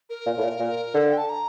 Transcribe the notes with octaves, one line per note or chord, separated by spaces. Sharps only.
A#4
A#2
A2
A#2
A#2
D3 A4
F5
G5
A5
A#5